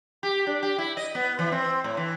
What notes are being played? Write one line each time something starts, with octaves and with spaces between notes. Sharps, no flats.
G4
D4
G4
E4
D#5
B3
E3
C4
A2
E3